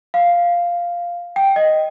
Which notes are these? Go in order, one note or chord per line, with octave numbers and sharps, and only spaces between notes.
F5
G5
D#5